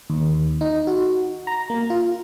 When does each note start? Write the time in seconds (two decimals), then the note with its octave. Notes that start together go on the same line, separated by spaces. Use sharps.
0.10 D#2
0.61 D#4
0.87 F#4
1.47 A#5
1.70 A#3
1.90 F4